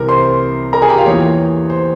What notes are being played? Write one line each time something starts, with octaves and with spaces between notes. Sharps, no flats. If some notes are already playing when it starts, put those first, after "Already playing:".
Already playing: C2 C3 E3 A#4
C5 C6
A#4 A#5
G#4 G#5
G4 G5
F4 F5
E2 E3 A#3 C#5
C5